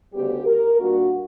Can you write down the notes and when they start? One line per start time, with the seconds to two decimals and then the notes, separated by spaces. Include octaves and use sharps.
0.13 D2 C#3 G3 B3 G4
0.46 A#4
0.80 A#2 G3 A#3 D4 F#4